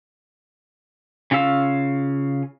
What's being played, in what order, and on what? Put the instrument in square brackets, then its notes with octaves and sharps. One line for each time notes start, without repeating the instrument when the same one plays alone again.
[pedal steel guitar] C#3 C#4 F4 F5 E6